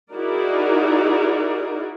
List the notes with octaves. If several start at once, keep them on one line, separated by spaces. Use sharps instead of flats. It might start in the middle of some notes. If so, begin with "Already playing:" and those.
D#4 E4 F#4 G#4 A#4 D5